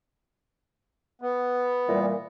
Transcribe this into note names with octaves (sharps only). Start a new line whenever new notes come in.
B3
A#2 E3 G3